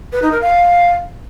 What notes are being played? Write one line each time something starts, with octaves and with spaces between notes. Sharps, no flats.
B4
D#4
A#4
F5